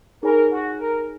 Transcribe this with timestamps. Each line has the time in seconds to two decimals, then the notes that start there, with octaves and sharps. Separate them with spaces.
0.23 D#4 G#4 A#4 C#5 G#5 B5
0.51 F#4
0.79 A#4